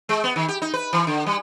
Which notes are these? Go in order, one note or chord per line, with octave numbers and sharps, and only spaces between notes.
G#3
B3
D#3
G4
D#4
B4
E3
D3
G3